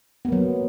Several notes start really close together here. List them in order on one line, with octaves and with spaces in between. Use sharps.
B3 A#3 F#3